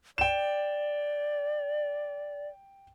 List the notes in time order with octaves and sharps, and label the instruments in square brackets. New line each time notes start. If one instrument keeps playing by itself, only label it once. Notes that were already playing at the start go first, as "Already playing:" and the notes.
[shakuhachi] D5 [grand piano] G5 E7